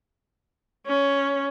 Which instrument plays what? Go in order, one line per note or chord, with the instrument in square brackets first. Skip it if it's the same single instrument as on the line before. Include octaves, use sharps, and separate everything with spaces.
[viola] C#4